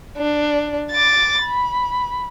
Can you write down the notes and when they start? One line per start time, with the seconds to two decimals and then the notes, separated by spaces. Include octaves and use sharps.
0.17 D4
0.91 D6 A6
1.42 B5